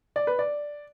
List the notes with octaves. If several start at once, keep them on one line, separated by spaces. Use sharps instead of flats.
D5
B4
D5